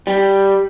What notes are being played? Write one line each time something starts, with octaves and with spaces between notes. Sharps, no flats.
G3